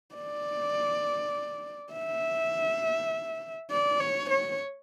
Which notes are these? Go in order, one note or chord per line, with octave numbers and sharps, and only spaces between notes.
D5
E5
D5
C#5
C#5